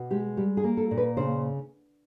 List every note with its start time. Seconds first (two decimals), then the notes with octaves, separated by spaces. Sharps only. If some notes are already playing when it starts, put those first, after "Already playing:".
Already playing: B2
0.11 G#3 G4
0.37 G3 G4
0.57 G#4
0.64 A#3
0.77 A4
0.91 A#2
0.97 B4
1.17 C#3 C5